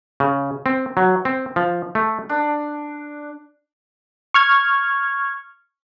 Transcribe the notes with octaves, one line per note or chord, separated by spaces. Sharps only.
C#3
C4
F#3
C4
F3
A3
D4
C#6 F6 G#6